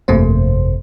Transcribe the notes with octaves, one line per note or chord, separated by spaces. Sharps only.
G1 F2 C3 A3 A#3 C5